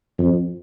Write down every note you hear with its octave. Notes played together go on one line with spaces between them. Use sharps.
F2